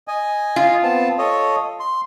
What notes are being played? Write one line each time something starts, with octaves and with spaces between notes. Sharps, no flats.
D#5 G#5
F4
B3 C4 A5
A4 C#5 D#5
C6